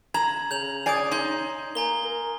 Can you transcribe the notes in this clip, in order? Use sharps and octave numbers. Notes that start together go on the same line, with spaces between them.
A#5 G#6 E7 F#7
C#3 G6 F7 F#7
D5 G#5 D#6 G6 C7
D#4 C6 G6
A#3 G#5 A#5 G7
A#4